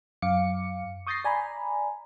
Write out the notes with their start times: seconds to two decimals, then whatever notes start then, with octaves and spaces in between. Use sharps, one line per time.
0.22 F#2 F5 D6 C#7
1.07 C#6 D#6 G6 A6 A#6 C7
1.25 D5 G#5 A#5 B5